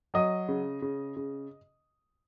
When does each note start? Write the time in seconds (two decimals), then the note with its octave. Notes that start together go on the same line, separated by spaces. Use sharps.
0.14 F#3 D#5 D#6
0.48 C#3
0.82 C#3
1.17 C#3